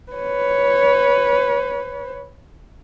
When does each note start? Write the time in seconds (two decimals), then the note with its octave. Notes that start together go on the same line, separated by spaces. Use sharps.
0.12 B4 C#5